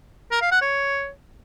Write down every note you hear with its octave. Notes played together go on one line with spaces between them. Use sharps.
A#4
F5
F#5
C#5